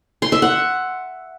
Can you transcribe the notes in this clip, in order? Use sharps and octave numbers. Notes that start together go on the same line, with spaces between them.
C6
E5
F#5